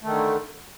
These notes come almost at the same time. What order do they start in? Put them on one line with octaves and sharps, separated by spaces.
A3 D#3 D3